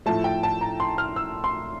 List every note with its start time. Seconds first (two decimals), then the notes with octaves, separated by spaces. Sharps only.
0.06 A2 F3 A3 A5
0.24 G5
0.43 A5
0.61 A#5
0.80 C6
0.98 F6
1.16 E6
1.44 C6